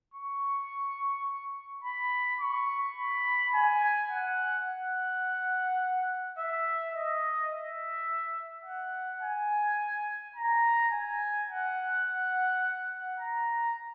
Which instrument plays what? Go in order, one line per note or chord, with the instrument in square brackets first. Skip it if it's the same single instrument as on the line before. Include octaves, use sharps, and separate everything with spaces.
[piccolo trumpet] C#6
B5
C#6
B5
G#5
F#5
F#5
E5
D#5
E5
F#5
G#5
A#5
G#5
F#5
A#5